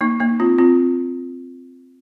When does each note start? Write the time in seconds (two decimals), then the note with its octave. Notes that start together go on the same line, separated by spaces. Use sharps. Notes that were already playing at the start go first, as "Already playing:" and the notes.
0.01 A#3 D#4
0.20 A#3 D#4
0.40 C4 F4
0.58 C4 F4